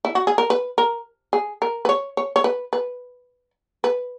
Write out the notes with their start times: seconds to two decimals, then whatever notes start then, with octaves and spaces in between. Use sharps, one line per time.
0.05 E4
0.15 F#4
0.27 G#4
0.38 A#4
0.50 B4
0.78 A#4
1.33 G#4
1.62 A#4
1.85 B4
1.89 C#5
2.17 C#5
2.36 C#5
2.44 B4
2.73 B4
3.84 B4